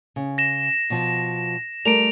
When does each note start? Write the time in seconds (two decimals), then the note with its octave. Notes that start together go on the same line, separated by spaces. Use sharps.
0.16 C#3
0.38 A#6 E7
0.90 B2 F3
1.85 G3 A3 A#4 D7 F7